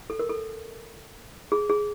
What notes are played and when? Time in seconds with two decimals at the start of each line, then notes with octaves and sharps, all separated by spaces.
0.10 A4
0.19 A#4
0.29 A4
1.52 G#4
1.70 G#4